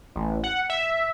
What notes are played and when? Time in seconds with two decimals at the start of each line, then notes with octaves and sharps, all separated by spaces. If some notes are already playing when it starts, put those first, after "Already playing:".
0.16 A1
0.44 F#5
0.70 E5